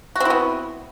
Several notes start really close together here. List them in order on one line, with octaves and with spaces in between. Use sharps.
F#4 C4 E4 B3